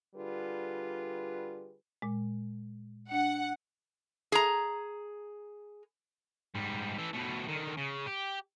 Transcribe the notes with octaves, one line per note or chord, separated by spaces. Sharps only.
D3 G3 F4 G#4 B4
A#2 G#3
D4 F#5
G#4 A#5
G#2 G3
E3 A4
B2 A3
D3 D#3
C#3
G4